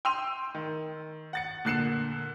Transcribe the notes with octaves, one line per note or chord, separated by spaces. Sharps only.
G5 C6 E6 D#7 F7
D#3
F#5 A6 C#7
A#2 D3 F#6 C7 C#7 E7